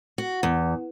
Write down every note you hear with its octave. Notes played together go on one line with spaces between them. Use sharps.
F#4
E2